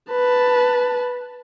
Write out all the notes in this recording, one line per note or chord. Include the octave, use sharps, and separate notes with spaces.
B4 A5